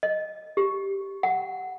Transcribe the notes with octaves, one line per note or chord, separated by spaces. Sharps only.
D#5
G4
F#5